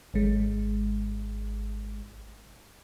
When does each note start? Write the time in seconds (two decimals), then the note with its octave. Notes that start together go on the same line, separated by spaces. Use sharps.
0.14 G#1 G#3